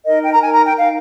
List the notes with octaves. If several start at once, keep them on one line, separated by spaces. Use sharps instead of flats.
D#4 A#4 D#5
G5
A#5
D#4 A#4 G#5
A#5
G5
D#4 A#4 F5